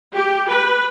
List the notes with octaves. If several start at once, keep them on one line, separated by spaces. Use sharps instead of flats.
G4
B4